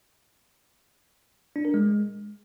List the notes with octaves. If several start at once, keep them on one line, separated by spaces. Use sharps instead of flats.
D4
A#4
G#3